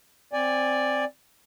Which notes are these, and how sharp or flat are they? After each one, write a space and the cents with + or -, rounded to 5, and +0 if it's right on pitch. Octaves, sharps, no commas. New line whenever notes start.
C4 +0 D5 +0 G#5 -15